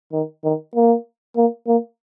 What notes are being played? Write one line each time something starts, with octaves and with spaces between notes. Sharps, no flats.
D#3
D#3
A#3
A#3
A#3